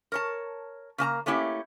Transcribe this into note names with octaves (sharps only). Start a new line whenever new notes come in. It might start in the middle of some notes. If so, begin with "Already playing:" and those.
A#4 C#5 A5
C#3 A#3 A5 A#5
A3 A#3 C#4 E4 G4